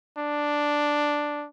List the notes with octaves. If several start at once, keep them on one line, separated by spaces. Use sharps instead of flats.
D4